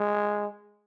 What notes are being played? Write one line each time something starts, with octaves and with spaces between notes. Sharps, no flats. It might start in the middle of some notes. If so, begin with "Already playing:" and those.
Already playing: G#3